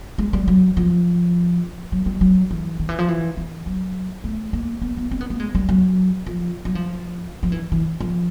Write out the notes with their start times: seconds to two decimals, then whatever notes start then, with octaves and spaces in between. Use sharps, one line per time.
0.18 G#3
0.33 G3
0.48 F#3
0.77 F3
1.92 F#3
2.06 G3
2.21 F#3
2.51 E3
2.80 D#3
2.89 E3
2.99 F3
3.08 E3
3.37 E3
3.66 F#3
4.24 A3
4.53 A#3
4.82 B3
4.97 B3
5.11 C4
5.21 B3
5.30 A#3
5.40 G#3
5.55 G3
5.69 F#3
6.26 F3
6.65 F#3
6.75 F3
7.43 F3
7.52 E3
7.72 E3
8.00 F3